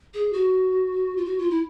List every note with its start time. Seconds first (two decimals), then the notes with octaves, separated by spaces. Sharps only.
0.14 G#4
0.33 F#4
1.17 F4
1.25 F#4
1.38 F4
1.50 E4